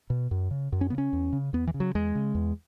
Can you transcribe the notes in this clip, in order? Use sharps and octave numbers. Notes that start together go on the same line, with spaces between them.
B2
F#2
C#3
F#2
C#4
C#3 B3
C#4
E2
C#3
E2 B3
E3
C#3
F#3
E2 G#3
C#3
E2